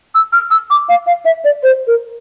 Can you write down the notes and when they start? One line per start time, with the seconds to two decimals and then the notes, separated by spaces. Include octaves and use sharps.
0.15 E6
0.33 F6
0.51 E6
0.70 D6
0.89 F5
1.06 F5
1.25 E5
1.44 D5
1.63 C5
1.87 A#4